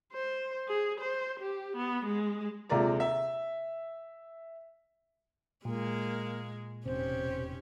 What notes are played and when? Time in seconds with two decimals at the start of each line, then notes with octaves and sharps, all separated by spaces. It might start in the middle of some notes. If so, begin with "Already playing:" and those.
0.13 C5
0.68 G#4
1.00 C5
1.40 G4
1.77 B3
2.05 G#3
2.69 D#1 C3 G#3 F4 D5 A#5
3.00 E5
5.65 A#2 G#3 A#3
6.86 E1 C3 C#4 D#4 G4 C5